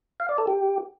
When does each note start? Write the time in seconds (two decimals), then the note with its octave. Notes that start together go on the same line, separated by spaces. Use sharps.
0.20 F5
0.29 D5
0.38 A4
0.47 G4